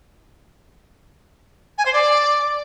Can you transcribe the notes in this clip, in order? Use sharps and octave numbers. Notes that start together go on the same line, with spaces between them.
G#5
C5
D5